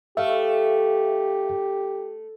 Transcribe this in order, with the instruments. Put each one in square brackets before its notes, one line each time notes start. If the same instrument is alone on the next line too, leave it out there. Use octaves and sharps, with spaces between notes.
[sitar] A3 [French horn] G4 [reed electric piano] E5 F5